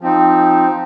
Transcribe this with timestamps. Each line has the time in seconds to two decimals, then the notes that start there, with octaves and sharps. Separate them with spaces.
0.01 F3 C4 D#4
0.70 F3